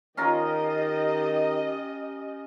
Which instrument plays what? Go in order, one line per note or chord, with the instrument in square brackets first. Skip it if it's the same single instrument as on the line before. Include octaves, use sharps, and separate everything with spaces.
[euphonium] D#3 [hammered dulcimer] C#4 F4 A#4 [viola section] G4 D#5